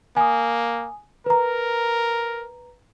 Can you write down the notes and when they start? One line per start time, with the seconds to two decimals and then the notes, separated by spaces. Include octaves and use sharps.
0.17 A#3 G#5 D#6
1.26 A#4 B4 A#5